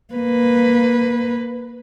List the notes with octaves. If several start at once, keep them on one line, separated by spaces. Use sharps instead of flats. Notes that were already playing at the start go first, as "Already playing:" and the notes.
A#3 B4